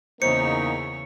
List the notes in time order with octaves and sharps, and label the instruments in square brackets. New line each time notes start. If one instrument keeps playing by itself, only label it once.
[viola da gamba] E2 C#3 C#5 [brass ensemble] A#3 D#4 [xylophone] C5 [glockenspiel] C#7